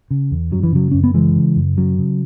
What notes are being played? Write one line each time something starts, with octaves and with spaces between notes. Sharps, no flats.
C#3
E2
F#2 F#3
E3
C#3 F#3
F#2 C#4
B3
C#3 E3 G#3
C#3
F#2
C#3 F#3
C#3